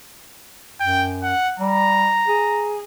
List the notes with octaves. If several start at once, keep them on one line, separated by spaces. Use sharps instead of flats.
F#2 G5
F#5
G3 A#5
G#4